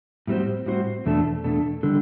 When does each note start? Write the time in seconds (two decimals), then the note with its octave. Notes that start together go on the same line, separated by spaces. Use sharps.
0.27 A2 G3 C4 F#4 C5
0.66 A2 G3 C4 F#4 C5
1.06 E2 B2 A3 D4 A4
1.44 E2 B2 A3 D4 A4
1.83 D3 G3 D4 A4